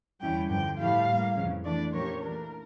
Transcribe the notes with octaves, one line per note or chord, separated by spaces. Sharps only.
E2 D3 G3 C#4 E4 G5
G2 D3 F3 G5
A2 F3 A3 E4 G4 F5
A2 G3 A#3
F2 C#3 E3
E3 A3 D4 D5
A#2 F3 C#4 G4 A#4 C#5
E3 A3 D4 A#4